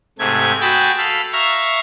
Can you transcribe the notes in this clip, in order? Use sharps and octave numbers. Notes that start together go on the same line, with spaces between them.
G#2 C3 A3 G#6
F#4 G#4 G5 A5 B5
A4 F5 B5
E5 F5 A#5 C#6 F6